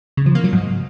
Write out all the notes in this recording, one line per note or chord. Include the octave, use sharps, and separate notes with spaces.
C#3
F3
A#3
F#3
G#2